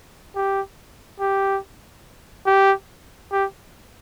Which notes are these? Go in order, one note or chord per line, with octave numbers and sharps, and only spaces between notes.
G4
G4
G4
G4